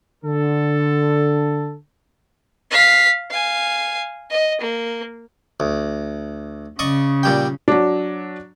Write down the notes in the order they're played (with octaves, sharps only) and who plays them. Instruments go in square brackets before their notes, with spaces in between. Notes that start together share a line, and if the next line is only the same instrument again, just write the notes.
[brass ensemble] D3 A4
[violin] F5 B6
F5 G#5
D#5
A#3
[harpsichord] D2
[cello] C#3 [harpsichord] D5 D#5 C#6
[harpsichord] A#2 G3 G5
[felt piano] F#3 D4